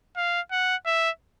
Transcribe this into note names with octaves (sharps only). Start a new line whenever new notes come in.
F5
F#5
E5